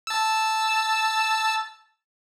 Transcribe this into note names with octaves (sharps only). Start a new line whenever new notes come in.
A5 E6